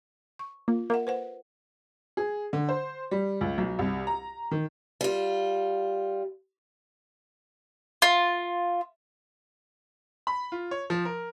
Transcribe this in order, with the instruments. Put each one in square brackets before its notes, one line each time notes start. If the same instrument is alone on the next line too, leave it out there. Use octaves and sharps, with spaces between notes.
[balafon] C#6
[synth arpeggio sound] A#3 [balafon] F4
[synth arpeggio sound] A#3 [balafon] A#4 E5 F#5
[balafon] B4 C5 F#5
[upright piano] G#4
D3
C5
G3
C#2
B1
C2
A#5
D#3
[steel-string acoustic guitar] G3 F4
[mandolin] F4
[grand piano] B5
F4
C#5
F3
A#4